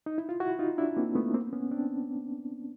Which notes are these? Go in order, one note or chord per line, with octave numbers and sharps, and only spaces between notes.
D#4
E4
F4
E4 F#4
D#4 F4
D4 E4
A#3 C4
A3 B3
A#3 C4
B3 C#4
C4 D4